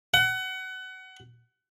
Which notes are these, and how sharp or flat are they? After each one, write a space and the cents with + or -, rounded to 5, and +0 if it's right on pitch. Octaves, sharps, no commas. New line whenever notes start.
F#5 +25